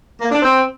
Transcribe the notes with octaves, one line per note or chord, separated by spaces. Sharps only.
A#3
D4
C4